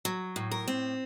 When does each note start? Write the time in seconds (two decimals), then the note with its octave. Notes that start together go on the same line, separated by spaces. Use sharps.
0.05 F#3
0.36 A2
0.51 A#4
0.68 C4